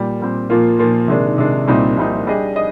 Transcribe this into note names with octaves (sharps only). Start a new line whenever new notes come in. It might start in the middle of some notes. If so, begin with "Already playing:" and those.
Already playing: A#2 G3
A#2 G3 C4
A#2 F3 A#3 F4
A#2 F3 A#3 F4
C3 D#3 G#3 D4
C3 D#3 G#3 D4
C2 A#2 G3 C4 D#4
C2 A#2 G3 C4 D#4
G3 D4 G#4 D#5
D#5